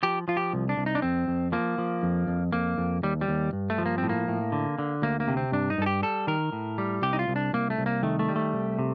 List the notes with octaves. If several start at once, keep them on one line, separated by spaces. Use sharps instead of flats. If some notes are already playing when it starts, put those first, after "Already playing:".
F3 G4
F3 F4
G4
C2
D4
C2
D#4
D4
F2 C4
F2
F3 A#3
F3
F2
F2
F2 A#3
F2
D#2 G3
G3
D#2
G2
A3
F3
A#3
C4
A2
A#3
A2
D3
D3
D2 A#3
A#3
C3
C4
G2 D4
D#4
G2 A4
G4
G3 A4
D#3 A#4
A2
G3
C2 G4
D#4
F4
C2
D4
C2 A#3
A3
C2
A#3
D#3 A3
A3
G3
A3
C2
C3